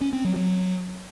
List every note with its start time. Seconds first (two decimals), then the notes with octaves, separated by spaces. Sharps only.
0.01 C#4
0.13 C4
0.24 F#3
0.36 F#3